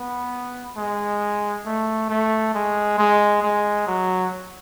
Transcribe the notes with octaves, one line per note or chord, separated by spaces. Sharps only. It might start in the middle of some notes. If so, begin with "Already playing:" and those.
Already playing: B3
G#3
A3
A3
G#3
G#3
G#3
F#3